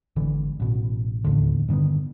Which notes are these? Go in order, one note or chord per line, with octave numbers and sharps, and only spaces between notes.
G#1 D3 E3
A1 B2
D1 A1 D#2 D3
G2 D3 D#3 B3